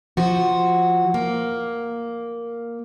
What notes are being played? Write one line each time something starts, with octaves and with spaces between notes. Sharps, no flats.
F3 F#4
A#3